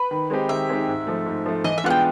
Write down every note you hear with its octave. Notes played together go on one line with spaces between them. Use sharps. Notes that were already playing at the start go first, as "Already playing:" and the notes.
Already playing: B4
D#3
G#3 C4 D#4 G4
D#3 E5
G#3 C4 D#4 G4
G#2
F3 A3
G#2
F3 A3
E3 D#5
E5
G#3 B3 D4 F4 F#5
G5